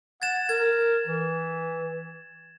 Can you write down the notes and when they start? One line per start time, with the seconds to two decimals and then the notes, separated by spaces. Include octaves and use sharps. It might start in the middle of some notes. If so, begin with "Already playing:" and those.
0.22 F#5 G#6 A6 E7
0.49 A#4 G#6
1.07 E3